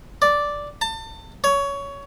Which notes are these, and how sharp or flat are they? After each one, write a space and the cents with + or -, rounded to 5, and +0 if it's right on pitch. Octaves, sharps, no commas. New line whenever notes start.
D5 -5
A5 +30
C#5 +20